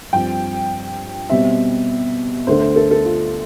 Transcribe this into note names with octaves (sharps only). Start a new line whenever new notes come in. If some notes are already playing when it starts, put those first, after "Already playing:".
G2 F3 C4 G5
B2 G3 C4 E5
D2 D3 A3 C5
C5
A4
A4
F4